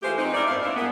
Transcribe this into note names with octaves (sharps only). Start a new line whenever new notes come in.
E3 G#3 A3 F4 G4 C5
C4 D#4
F#2 D#4 E4 A#4 D5
G#2 A3 B3 C5 F5
A#3 D4 E4
G2 G#3 A#3 B3